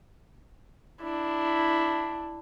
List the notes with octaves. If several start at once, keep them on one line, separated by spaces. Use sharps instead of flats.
D4 E4